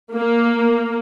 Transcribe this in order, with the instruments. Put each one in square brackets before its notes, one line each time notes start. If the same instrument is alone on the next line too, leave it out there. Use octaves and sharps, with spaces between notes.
[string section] A#3